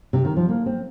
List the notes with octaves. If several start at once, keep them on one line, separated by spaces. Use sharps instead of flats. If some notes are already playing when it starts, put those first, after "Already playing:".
C3
D#3
F3
A#3
C4